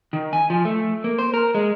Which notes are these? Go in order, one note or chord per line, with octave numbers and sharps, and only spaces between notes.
D#3
G#5
F3
A3
A#3
C5
A#4
G#3